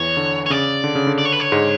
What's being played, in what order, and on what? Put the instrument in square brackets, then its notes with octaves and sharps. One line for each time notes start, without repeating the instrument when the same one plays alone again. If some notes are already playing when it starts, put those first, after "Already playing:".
Already playing: [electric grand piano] E2 E3 [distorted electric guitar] C#5
[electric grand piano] D3
[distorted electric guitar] C#5
[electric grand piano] C#3 [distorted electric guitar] D5
[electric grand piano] D3
C#3
D3
[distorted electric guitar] D5
C#5
B4
C#5
[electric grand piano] G#2 G#3